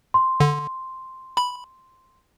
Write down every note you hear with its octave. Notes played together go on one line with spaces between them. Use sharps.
C6
D3
B5